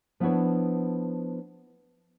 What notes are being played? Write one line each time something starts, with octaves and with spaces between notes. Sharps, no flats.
F3 B3 D4 E4 B4 C#5